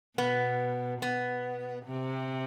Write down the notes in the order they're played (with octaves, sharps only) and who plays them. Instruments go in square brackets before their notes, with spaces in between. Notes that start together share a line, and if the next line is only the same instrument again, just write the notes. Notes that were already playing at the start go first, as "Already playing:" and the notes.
[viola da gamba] B2 [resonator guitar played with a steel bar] B3
[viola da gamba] B2 [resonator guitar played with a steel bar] B3
[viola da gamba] C3